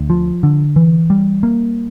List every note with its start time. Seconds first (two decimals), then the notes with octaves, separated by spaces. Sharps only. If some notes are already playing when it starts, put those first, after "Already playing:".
Already playing: D2
0.10 F3
0.43 D3
0.76 E3
1.10 G3
1.43 A#3